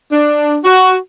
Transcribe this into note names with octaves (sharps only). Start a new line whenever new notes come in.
D4
F#4